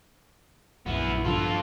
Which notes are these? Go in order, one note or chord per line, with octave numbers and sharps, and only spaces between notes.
A#1 F#2 E3 B3
G2 D3 F3 F4 A4